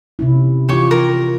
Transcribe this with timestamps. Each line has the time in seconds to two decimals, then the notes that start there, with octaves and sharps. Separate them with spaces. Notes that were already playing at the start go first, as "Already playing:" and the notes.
0.19 C3 C#4 E4
0.69 E3 F4 G4 C#5 C#6
0.91 A#4